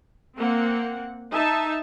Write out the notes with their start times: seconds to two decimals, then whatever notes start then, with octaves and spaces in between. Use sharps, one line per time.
0.38 A#3 C4 F#5
1.33 D#4 E5 A5